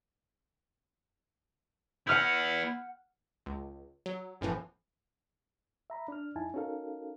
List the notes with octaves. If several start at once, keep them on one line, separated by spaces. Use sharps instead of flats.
B3 E4 F#5 F6 G6
C#2
F#3
G1 F#2 A2 E3 F3
E5 A#5 B5
D4 F6
F2 D#4 E4 G#5 A5
C#4 D#4 F#4 A4 A#4 F5